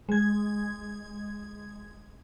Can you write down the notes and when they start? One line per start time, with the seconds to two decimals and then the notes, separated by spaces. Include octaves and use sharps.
0.09 G#3 G#6